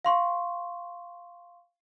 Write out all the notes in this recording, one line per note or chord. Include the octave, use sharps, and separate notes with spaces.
F5 C6 C#6